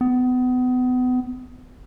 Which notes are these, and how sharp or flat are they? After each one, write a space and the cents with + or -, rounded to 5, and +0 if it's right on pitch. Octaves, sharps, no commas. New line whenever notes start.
B3 +30